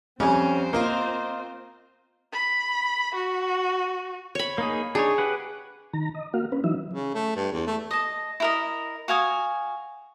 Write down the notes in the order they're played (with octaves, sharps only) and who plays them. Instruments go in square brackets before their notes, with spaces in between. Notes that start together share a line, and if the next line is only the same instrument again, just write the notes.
[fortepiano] F2 G3 G#5 [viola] C4 C5 [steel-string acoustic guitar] C#4
[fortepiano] A#3 [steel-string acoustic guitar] F4 A#4 D#5
[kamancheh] B5
F#4
[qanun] C#5 B5
[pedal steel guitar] A#3 D#4 G#4
[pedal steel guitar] D4 D#4 C#5 [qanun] G#4
[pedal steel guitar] G4 B4 F#5
[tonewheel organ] D#3 A#5
D#5
A#3 F#4 F5
C#4 B4
E3 F#3 D#4 E5
[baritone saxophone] C#3
A3
G2
E2
A3
[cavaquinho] D#5 A5
E4 A#4 D#5
F#4 F5 G#5 D#6